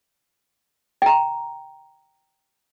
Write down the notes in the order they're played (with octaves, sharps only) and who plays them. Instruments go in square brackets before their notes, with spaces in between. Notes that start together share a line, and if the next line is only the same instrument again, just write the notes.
[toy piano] G5 A#5